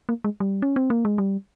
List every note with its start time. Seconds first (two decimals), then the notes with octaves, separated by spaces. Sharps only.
0.09 A#3
0.24 G#3
0.40 G3
0.62 C#4
0.76 C4
0.90 A#3
1.05 G#3
1.18 G3